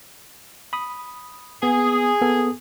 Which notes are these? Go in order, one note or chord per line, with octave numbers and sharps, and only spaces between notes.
B5 D#6
B3 G#4
B3 A4